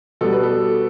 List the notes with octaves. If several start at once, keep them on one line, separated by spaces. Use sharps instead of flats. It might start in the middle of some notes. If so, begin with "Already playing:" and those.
B2 G3 A4
B4
A4